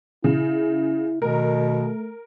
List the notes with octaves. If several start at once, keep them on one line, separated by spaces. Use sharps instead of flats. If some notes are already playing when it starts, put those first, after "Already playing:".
C#3 E4
B2 D#3 A3 A#4